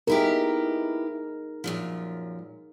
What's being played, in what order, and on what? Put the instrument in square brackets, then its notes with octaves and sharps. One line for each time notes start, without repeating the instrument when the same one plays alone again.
[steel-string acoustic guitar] B3 E4 G4 [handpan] D#4 G#4 A#4
[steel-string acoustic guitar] F#2 A#2 F3